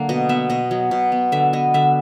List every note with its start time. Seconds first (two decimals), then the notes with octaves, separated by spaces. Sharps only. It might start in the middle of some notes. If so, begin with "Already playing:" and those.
Already playing: D3 F#3 A#3
0.09 B2 D#5
0.29 B3 E5
0.50 B2 D#5
0.71 F#3
0.91 B2
1.12 B3
1.32 D3 E5
1.53 B3 D#5
1.74 D3 E5